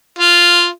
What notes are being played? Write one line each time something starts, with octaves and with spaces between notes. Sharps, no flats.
F4